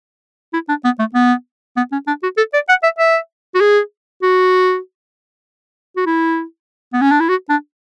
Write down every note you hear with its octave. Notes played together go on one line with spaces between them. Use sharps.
E4
D4
B3
A3
B3
B3
C#4
D4
F#4
A4
D5
F#5
E5
E5
F#4
G#4
F#4
F#4
E4
B3
C#4
D4
E4
F#4
D4